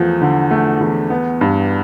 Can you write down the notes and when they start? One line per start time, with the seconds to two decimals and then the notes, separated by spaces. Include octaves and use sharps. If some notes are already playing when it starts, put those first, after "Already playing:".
Already playing: E2 F3 A3
0.21 D3
0.51 A3
0.81 E2
1.10 B3
1.41 G2